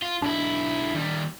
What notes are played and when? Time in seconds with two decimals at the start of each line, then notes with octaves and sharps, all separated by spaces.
0.02 F4
0.22 B1 D4 E4
0.94 D#2 G3